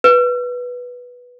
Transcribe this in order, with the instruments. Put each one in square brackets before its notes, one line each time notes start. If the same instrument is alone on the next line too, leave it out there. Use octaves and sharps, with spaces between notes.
[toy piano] B4